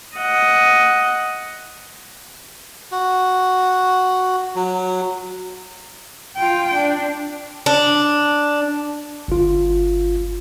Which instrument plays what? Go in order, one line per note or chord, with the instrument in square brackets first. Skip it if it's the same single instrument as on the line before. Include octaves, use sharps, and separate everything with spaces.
[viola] D#5 F#5
[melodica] F#4
F#3
[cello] F4 G5
D4
[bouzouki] D4
[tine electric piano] G1 F4